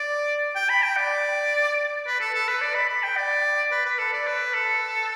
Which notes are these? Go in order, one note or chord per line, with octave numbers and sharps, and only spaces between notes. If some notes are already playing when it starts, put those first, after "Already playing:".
Already playing: D5
G5
B5
G5
D5
B4
A4
A4
B4
D5
B5
B5
G5
D5
B4
B4
A4
D5
B4
A4